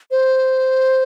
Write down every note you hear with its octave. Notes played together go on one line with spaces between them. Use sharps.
C5